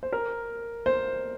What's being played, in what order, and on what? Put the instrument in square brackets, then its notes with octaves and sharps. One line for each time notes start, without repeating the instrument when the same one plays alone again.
[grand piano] C5
A#4
C5